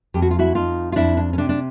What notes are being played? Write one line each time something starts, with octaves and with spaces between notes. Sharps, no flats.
F2 G4
F#4
F4
E4 F#4
F2 D#4 F4
F4
F2 D4 E4
D4
C#4
C3 D4
D4